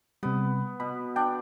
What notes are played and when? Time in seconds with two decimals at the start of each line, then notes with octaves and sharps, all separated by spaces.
0.23 C3 G3 B3
0.80 B2 B5
1.16 D4 G5